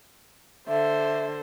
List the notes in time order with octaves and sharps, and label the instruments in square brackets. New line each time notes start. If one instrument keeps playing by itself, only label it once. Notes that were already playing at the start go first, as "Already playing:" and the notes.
[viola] D3 C5 [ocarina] E5